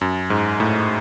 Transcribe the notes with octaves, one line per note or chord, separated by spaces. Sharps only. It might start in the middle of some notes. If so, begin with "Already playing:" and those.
F#2
G#2
A2